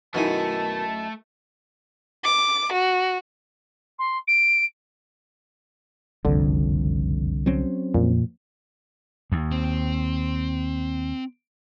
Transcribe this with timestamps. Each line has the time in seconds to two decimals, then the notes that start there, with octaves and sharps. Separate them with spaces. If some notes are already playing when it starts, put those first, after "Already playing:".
0.14 F#2 B2 D#3 A3 D#4 E4 G#5 A5
2.24 D6
2.73 F#4
3.98 C6
4.27 D7
6.25 F#1 C2 F2 D3
7.46 F#3 C4 C#4
7.94 F2 A#2 F3 A#3
9.32 D#2
9.52 C4